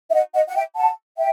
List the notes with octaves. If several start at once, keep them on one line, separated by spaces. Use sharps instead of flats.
E5
D#5 F#5
D#5 F#5
F#5
E5 G5
F#5 A5
E5 G5